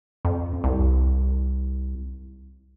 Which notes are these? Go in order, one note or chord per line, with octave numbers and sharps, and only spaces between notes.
F2
C2